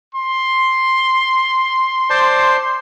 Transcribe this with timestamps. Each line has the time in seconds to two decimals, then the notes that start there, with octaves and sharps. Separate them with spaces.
0.15 C6
2.10 C5 D5 A5